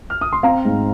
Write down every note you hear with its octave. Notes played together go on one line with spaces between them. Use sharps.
F6
D#6
C6
C4 F5 A#5
G#2